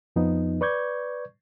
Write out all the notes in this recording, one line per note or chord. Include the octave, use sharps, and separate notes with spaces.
F2 F3 B3 D#4
B4 D5 C#6 G6 G#6